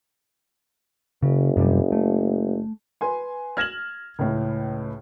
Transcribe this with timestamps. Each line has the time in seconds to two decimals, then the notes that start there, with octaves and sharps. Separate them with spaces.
1.23 F#1 C#3
1.57 F#2 C3 G3
1.92 A3
3.01 B4 G#5 C6
3.57 F6 G#6 A#6 E7 F#7
4.19 C#2 A2